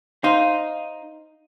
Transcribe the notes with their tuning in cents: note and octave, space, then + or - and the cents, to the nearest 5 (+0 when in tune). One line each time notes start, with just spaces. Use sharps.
D#4 +0 C5 +0 F5 +0